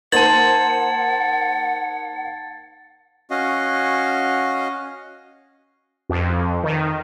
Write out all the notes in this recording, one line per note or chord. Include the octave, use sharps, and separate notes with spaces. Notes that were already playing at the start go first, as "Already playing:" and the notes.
A#3 D#4 C5 F#5 A5 G#6 A6 F#7
C#4 F#4 D#5 F5
F2
D#3